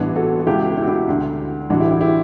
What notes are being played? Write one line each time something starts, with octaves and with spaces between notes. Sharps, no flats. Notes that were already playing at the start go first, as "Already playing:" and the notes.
Already playing: A1 G2 E3 B3 D4
F#4 A4
F#4
C#2 B2 E4 G4
E4 G4
F#4
E4 G4
D2 D3
A1 G2 E3 D4 F#4
E4 G4
E4 G4
E4 G4